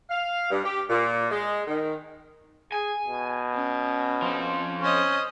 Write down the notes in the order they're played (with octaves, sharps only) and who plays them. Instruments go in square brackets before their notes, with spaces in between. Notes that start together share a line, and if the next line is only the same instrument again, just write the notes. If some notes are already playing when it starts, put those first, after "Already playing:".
[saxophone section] F5
G2
G4
A#2
G#3
D#3
[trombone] G#4 [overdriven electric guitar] G#5
[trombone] B2
[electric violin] C#4
[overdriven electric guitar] F3 C4
[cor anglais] C#4 [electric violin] C5 D#5